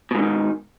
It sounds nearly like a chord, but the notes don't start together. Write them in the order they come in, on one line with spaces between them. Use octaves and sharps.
B2 G#2 D3 D#3